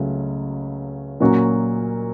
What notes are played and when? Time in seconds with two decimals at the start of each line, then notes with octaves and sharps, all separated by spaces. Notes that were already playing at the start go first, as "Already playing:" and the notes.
Already playing: C#2 C#3 F#3 A3
1.20 A#2 F#3 A#3 C#4 F#4